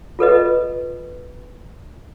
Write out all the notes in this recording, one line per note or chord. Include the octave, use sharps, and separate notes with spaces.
F4 A4 B4 D#5